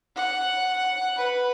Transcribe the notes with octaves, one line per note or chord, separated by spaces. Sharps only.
F#5
B4